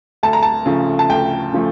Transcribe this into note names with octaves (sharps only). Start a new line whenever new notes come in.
D2 A5
A#5
A5
C#3 F3 A3
A5
D2 G5
C#3 F3 A3